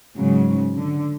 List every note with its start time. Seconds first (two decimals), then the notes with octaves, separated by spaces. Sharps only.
0.15 G#2 C#3 F#3
0.75 D3